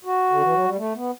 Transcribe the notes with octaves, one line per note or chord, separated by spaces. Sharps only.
F#4
D3
E3
F#3
G3
A3
B3